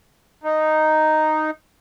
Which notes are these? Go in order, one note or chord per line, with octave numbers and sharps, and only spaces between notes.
D#4